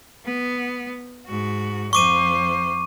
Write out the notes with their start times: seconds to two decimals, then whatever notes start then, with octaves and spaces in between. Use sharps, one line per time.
0.25 B3
1.27 G#2 F#4
1.93 F2 C5 C#6 D6 D#7